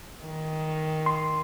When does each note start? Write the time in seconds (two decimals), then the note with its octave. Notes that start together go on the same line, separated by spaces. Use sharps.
0.25 D#3
1.06 C6